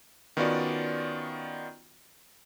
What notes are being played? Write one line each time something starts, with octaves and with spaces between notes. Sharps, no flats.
D#3 B3 C#4 F4 F#4 D5